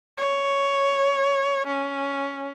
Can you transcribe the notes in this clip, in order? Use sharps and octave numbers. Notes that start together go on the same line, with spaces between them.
C#5
C#4